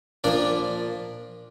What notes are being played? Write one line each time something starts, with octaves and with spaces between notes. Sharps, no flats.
A#2 F3 D4 D5